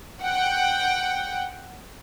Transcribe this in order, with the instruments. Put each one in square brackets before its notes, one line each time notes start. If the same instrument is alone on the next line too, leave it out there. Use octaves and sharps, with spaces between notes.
[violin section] F#5 G5